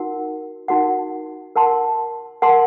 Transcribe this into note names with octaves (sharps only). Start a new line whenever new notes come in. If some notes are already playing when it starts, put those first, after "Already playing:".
Already playing: D#4 F#4 A#4 F#5
D#4 F#4 A#4 F#5
A#4 F#5 A5 C6
A#4 F#5 A5 C6